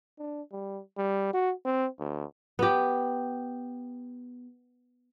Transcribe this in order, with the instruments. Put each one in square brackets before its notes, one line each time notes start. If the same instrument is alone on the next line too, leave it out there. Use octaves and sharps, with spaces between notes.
[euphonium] D4
G3
G3
F#4
C4
D2
[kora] B3 G4